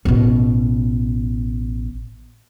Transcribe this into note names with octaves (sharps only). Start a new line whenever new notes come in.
A1 B2